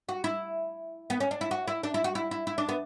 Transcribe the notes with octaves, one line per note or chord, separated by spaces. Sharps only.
F#4
E4
B3
C#4
D4
E4
F#4
E4
D4
E4
F#4
E4
E4
E4
D4
B3